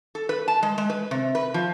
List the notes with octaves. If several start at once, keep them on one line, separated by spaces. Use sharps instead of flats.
A4
B4
A5
G#3
G#3
B4
C3
B4
F3